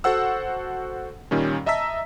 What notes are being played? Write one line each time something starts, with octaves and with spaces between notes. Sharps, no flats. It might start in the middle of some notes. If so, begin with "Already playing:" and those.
F#4 A4 C5 F#5 E6
A#2 D#3 G3 C#4
D#5 E5 A5 A#5 E6 B6